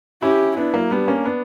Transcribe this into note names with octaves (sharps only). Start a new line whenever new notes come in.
C#4 E4 G4
B3 D4 E4
F#3 A#3
G3 B3 D4
A#3 C#4
B3 D4